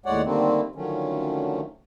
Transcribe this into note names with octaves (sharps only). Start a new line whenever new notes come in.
D#2 A2 G#3 C#5 D5 F#5
D3 D#3 G3 A3 A#3 C4
D3 D#3 F3 F#3 A3 C#4